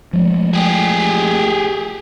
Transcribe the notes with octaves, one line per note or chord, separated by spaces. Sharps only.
F3 G#3 A3
G4 G#4